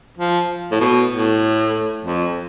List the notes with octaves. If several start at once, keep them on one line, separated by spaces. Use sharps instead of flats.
F3
A2
B2
A2
F2